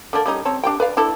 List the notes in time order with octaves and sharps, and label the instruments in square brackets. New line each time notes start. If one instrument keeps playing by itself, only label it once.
[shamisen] D3 A#3 D4
G3 C#4 D#4
C4 C#5 A5
D4 G4 G5
B4 D5 F5
D4 E4 A4